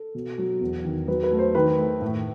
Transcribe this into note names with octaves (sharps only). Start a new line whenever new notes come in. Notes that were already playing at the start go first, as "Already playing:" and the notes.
Already playing: A4
B2
F#3
E2
D#3
F#3 B4
B4
A3
C5
D#3 B4
A3
A2